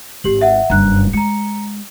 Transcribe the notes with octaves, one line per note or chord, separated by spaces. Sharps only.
G#1 G4 F#7
E5 F#5
F#1 G2 A#5 F#6
G#3 A#5 C#7